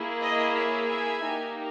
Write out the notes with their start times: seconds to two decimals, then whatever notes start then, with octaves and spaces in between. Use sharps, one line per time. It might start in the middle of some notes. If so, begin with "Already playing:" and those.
Already playing: A#3 E4 G#4
0.22 D#5
0.55 C#5 E5
0.88 E5 G#5
1.22 A#3 D#4 G4